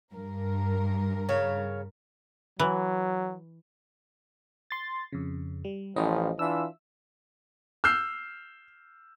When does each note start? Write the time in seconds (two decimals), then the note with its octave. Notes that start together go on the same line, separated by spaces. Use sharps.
0.12 G2 A#4
1.29 C#3 C#5 F5
2.59 E3 F#3
4.71 C6 A6
5.12 F2 C#3
5.65 G3
5.96 A1 E3 F3 C#4 D#5
6.39 E3 D4 F4 E5 E6
7.84 E6 F6 G6 C7